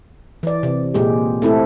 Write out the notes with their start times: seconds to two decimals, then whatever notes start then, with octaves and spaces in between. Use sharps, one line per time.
0.43 E3 D5
0.63 C3
0.94 A#2 G#3 G4
1.42 A3 C4 E4 A4